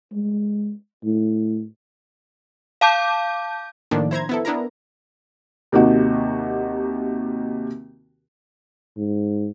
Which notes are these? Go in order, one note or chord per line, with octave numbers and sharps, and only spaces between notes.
G#3
A2
F5 A5 D6 G6
A2 D#3 F3 A#3 D4
E4 C5 A#5 G#6
B3 E4 A4
B3 D4 E4 A#4 A#5
D#2 C3 D#4 F#4
G#2